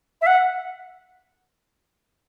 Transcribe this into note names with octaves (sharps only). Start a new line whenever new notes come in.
E5
F#5